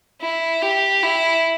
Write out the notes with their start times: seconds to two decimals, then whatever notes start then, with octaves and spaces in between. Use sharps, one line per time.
0.21 E4
0.62 G4
1.03 E4